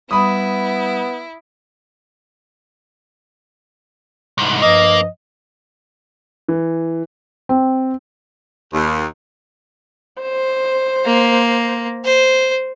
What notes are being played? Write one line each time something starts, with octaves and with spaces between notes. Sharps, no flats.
G2 G3 B3 E4 B5 D#6
C2 G#2
G2 F3 A#3 D#5
E3
C4
D#2
C5
A#3
C5